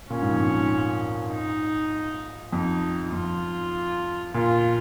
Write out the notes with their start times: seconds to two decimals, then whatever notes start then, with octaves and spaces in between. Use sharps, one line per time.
0.10 A#2 C#4
0.22 G#2
0.31 F2
0.42 G#2
1.31 D#4
2.52 F2 D#4
3.13 F2 F4
4.34 A#2 F4